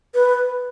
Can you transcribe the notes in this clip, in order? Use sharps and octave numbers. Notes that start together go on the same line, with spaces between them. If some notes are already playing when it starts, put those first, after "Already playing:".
B4